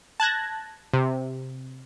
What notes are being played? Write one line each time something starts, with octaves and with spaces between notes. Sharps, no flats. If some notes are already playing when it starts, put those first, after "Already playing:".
A5 F#6 G#6 A#6
C3